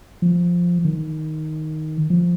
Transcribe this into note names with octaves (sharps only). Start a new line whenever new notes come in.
F3
D#3
F3